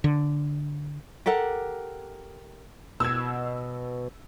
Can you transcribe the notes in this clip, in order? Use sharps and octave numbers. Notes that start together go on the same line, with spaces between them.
D3
G4 A4 A#4 F#5
B2 E6 G#6